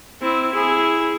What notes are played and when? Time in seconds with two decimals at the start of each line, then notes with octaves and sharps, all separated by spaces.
0.21 C4 E4
0.52 E4 G#4